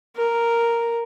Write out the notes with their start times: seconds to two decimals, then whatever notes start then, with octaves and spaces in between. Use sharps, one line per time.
0.16 A#4